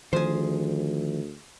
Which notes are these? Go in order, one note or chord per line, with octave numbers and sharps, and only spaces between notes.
D2 D#3 F3 G#4 C5